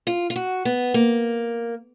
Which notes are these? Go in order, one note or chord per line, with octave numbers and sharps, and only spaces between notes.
F4
F4
F#4
B3
A#3